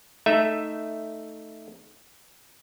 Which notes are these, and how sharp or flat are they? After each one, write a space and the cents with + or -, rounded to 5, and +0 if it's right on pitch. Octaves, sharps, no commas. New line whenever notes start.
A3 +0 D#4 +0 E5 +0